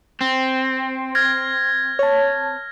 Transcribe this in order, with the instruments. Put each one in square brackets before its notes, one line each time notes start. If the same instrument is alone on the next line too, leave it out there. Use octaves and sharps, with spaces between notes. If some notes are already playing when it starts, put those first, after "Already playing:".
[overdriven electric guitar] C4
[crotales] F6 G#6 A#6
[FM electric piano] C#5 A5